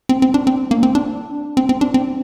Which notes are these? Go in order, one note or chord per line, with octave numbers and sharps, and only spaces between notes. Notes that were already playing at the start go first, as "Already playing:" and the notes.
C4
C4
D4
C4
A#3
C4
D4
C4
C4
D4
C4